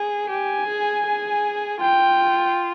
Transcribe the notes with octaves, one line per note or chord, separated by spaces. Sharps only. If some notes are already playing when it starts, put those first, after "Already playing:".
Already playing: G#4
G4 G#5
G#4
G#4
F4 G5